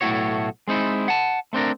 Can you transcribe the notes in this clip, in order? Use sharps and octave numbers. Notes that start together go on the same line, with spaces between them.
B1 A2 A3 E4 F#4 C#5
G#3 C4 D#4 E4
F#5 A5
A3 C4 D4 A#4